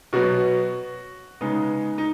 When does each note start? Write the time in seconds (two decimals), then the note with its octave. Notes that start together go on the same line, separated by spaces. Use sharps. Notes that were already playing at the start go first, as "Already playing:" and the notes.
0.13 B2 F#3 B3 F#4
1.41 C#3 G#3 B3 D#4
1.98 D#4